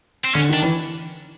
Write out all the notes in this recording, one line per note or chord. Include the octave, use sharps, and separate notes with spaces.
C4
D3 C#4
D#3 D4
E3